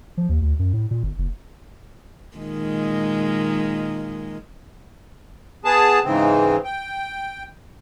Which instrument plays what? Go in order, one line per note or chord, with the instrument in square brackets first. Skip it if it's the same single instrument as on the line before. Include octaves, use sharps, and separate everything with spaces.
[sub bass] F3
D#2
D2
F#2
A2
A#2
G1
F#1
[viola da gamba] A#2 D#3 G#3
[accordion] B3 G#4 A5
G#2 C#3 E3 C4
G5